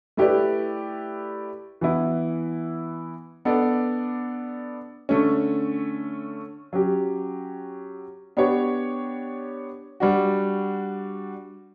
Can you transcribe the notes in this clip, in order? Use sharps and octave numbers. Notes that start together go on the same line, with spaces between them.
A3 E4 G4 B4 D5
E3 B3 E4
B3 D4 A4 D5
D3 A3 C#4
F#3 C#4 G4
B3 D4 G4 C#5
G3 D4 F#4